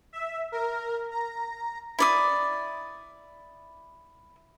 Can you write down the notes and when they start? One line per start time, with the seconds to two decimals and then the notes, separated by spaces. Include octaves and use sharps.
0.13 E5
0.52 A#4
1.11 A#5
1.99 E4 D5 D#6